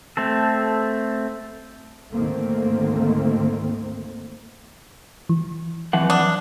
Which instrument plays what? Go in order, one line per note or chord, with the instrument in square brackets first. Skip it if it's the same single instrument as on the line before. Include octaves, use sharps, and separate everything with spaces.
[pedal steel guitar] A3 C4 A4
[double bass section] D2 G#2 D#3 A3 A#3 C4
[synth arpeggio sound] E3
[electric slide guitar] F2 E3 F#5 [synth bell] F#3
[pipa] D4 [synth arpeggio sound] D#6